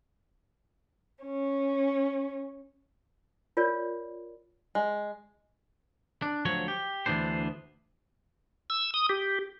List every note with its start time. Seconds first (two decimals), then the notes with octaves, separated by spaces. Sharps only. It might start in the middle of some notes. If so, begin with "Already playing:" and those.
1.23 C#4
3.57 F4 A#4 C#5 D5
4.75 G#3
6.22 D4
6.45 D2 F3 F#3 C#5
6.68 G4
7.06 D2 E3 B3 D4 C5
8.70 E6
8.94 D#6
9.09 G4